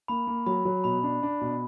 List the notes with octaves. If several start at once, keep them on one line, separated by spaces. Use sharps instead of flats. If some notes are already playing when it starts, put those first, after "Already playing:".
A#3 B5
A#3
F#3 B5
F#3
B2 B5
D4
D4
B2